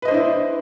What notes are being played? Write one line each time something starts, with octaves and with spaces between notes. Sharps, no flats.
D4 E4 B4 C5 D#5